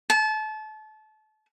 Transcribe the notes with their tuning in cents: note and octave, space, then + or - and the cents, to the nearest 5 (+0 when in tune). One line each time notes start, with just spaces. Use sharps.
A5 -30